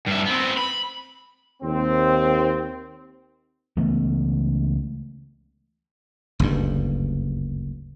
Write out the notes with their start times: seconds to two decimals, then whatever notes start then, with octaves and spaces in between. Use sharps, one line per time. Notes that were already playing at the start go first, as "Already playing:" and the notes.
0.06 G2 E5
0.26 B3 C4
0.57 B5
1.63 D#2 C4
3.77 C#2 E3 A3 B3
6.40 F#1 D2 G2